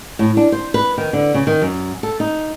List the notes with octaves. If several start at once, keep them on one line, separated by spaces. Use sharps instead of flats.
A2
D4
C5
B4
D#3
D3
C#3
D#3
F#2
A4
D#4